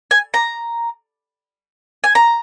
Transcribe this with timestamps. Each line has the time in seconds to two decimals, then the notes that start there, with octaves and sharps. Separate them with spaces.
0.11 G#5
0.34 A#5
2.04 G#5
2.15 A#5